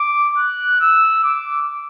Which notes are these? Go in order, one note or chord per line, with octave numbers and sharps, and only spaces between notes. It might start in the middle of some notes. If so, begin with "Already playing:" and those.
Already playing: D6
F#6
E6
D6